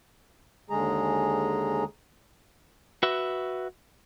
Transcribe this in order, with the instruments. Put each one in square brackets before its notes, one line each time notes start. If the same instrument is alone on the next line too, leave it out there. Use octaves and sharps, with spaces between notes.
[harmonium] D#2 D3 G#3 G#4 A#5
[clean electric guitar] F#4 B4 E5